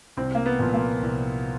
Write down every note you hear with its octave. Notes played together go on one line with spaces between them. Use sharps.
C2 C4
A#3
B3
A#2 F3
A#3
C2